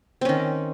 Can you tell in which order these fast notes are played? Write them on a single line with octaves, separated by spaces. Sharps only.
C4 C#4 D#3